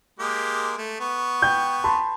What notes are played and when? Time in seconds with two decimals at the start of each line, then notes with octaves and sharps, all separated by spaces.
0.19 G#3 A#3 G4
0.78 A3
1.00 B3 C#6
1.42 G5 G6
1.84 A5 B5 C6